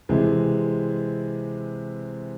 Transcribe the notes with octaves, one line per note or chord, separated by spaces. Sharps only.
C3 E3 G#3 C4